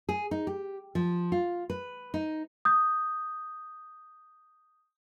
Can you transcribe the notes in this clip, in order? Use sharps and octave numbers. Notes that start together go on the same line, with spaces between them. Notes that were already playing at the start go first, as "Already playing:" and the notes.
G#4
D#4
G4
F3
F4
B4
D#4
D#6 G6